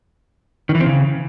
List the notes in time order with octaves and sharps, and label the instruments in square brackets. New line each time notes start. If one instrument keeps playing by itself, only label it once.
[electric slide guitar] D#3
E3
C4
C#3